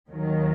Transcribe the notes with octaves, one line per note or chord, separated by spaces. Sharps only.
D#2 D#3 F#3